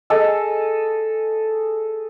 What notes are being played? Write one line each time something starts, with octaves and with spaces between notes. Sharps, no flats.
G#4 A4 D#5